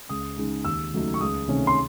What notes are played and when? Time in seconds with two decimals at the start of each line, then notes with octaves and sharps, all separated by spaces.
0.09 C#2 D#6
0.37 C#3 G#3 D#4
0.64 D#2 E6
0.93 C#3 F#3 A3 D#4
1.14 C#6
1.20 C#2 D#6
1.48 C3 D#3 A3 C#4
1.67 C6